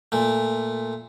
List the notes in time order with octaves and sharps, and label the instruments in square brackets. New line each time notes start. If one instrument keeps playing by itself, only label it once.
[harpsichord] A#2 A3